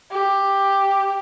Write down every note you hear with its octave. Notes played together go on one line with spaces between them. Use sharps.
G4